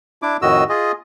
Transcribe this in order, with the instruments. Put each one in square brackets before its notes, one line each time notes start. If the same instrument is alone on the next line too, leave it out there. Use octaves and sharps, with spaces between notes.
[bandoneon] D4 E4 D6
F2 A2 D#3 F#4 D#5 E6
F4 G#4 D#5